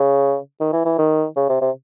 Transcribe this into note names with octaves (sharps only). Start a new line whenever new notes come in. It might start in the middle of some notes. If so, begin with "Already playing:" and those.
Already playing: C#3
D#3
E3
E3
D#3
C#3
C3
C3